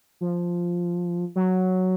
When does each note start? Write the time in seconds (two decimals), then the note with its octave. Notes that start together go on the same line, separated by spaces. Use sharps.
0.21 F3
1.35 F#3